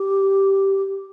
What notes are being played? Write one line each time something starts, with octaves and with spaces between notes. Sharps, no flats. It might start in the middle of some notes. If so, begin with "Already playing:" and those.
Already playing: G4